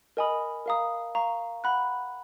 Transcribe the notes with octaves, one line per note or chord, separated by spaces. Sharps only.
A#4 D#5 G#5 B5 D#6
A#4 F5 A#5 D#6
F5 A#5 C#6
F#5 B5 F#6